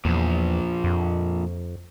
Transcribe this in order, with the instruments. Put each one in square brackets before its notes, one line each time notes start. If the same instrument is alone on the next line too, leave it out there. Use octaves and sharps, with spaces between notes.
[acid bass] E2 [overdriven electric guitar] A#2 F3
[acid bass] F2